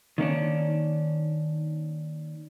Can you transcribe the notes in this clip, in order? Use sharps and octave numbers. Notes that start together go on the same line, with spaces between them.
D#3 A#3 C#4 D4